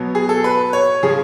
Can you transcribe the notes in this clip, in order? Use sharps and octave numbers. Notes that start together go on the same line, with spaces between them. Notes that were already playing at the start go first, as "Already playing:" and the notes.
Already playing: B2 F#3 B3
G#4
A4
B4
C#5
C#3 F3 G#4